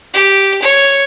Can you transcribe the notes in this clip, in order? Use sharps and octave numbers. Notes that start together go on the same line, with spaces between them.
G4
C#5